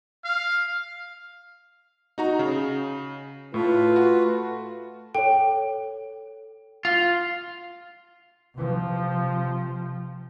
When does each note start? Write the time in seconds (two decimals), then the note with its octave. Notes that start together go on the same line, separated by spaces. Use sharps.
0.25 F5
2.18 D#4 F#4 A#5
2.39 C#3
3.54 A2 A3 F4 B4
3.96 F#4
5.15 A4 C#5 G5
6.85 F4
8.55 C3 F3